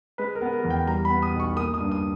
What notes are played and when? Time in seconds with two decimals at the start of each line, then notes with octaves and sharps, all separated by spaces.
0.18 G#3 B4
0.35 A#4
0.41 B3
0.53 A#4
0.64 E2
0.70 G5
0.87 G3 A#5
1.05 B5
1.10 B3
1.22 D#6
1.34 B1
1.40 C#6
1.57 A#3 D#6
1.74 D#6
1.80 G2
1.91 D#6